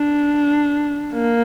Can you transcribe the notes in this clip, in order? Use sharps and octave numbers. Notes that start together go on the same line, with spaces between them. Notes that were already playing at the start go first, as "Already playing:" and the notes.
Already playing: D4
A#3